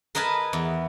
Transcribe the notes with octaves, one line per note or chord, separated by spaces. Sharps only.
A#4 B4 D#5 G#5 A5
E2